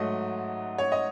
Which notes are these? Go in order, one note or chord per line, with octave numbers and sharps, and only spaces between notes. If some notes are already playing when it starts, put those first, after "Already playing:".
Already playing: G#2 F#3 A3 D#5
C#5
D#5